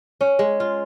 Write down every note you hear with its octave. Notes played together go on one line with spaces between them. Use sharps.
C#4
G#3
F4